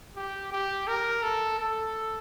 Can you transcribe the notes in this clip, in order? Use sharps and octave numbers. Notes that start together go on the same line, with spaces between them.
G4
G4
A#4
A4
A4